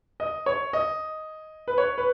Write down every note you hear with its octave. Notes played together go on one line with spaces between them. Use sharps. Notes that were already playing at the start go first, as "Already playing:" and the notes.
D#5
C#5
D#5
B4
C#5
B4